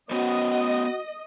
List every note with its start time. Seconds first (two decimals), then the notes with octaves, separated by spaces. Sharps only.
0.11 B3 C#4 F#4 C5 D#5